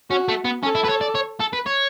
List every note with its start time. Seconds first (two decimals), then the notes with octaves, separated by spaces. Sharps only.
0.10 C#4 F#4
0.28 A3
0.45 B3
0.63 C#4 A4
0.75 E4
0.84 B4
0.89 C#5
1.01 D5
1.15 C#5
1.40 A4
1.53 B4
1.66 C#5